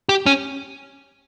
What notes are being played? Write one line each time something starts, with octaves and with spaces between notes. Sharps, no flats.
G4
C#4